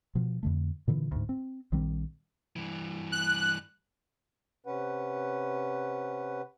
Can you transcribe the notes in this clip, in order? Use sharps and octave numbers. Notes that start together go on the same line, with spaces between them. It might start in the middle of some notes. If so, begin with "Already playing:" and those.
B2 F3
F2 D3 A3
A#2 D3 E3
D2 G#2
C4
A#1 D#3 G3 C4
G2 E3
F#6
C3 C#4 B4 F#5